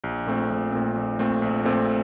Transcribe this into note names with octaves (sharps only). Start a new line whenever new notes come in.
A#1
A#2 A3 C4
A#1
A#2 A3 C4
A#1
A#2 A3 C4
A#1
A#2 A3 C4